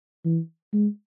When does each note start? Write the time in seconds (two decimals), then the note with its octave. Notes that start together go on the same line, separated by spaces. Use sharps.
0.25 E3
0.73 G#3